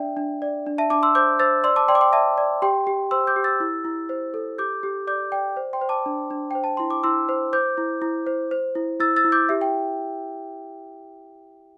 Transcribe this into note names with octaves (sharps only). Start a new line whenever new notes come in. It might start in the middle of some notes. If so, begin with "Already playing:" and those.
Already playing: D4 D5 E5 G5
D4
D5
D4
E5 A5
D4 A5 D6
C6 E6
C5 D6 G6
C5 E6 A6
D5 C6 E6
A5 D6
D5 G5 C6
D6
G5 C6
D5 E5 A5
D5
G4 G5 C6
G4
C5 C6 E6
D6 G6
G4
E6 A6
E4
E4
C5
A4
G4 D6 G6
G4
D5 D6 G6
D5 G5
C5
G5 C6
C5
A5 D6
D4
D4
C5 G5
A5
E4 C6
D6
E4 C6 E6
C5
C5 D6 G6
E4
E4
C5
C5
E4
E4 E6 A6
E6 A6
E4
D6 G6
G4 E5
G5